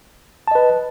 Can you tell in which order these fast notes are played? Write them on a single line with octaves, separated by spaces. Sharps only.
A5 D#5 B4